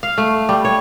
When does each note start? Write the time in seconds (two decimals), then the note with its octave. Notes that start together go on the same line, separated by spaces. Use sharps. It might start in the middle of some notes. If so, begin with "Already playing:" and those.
0.03 F5
0.18 A3
0.49 G3
0.65 C#5